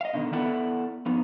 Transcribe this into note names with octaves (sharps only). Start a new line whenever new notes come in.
D#5 F5
B2 D3 D#3
B3 E4 A4 D5 F#5
F3 B3 D#4